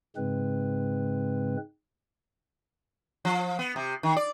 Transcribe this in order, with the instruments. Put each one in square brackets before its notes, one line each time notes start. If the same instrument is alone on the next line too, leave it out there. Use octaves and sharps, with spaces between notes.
[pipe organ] G#2 C#3 G#3 C4 B4
[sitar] F3
B3
C3
D#3
D5